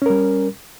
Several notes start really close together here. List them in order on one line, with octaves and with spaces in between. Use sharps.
C#4 A#4 G3